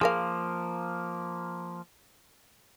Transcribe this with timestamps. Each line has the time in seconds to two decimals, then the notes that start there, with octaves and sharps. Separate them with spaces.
0.01 F3 A#3 G#4 A#4 F5